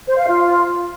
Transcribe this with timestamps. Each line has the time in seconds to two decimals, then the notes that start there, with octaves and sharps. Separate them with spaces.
0.07 C5
0.17 F5
0.27 F4